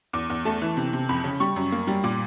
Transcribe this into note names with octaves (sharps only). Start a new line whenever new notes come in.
E2 D6
E2
A3 A5
E3
C3
C3
F2 B5
C#3
G3 C#6
F#2
A#3
G3
A#2 D6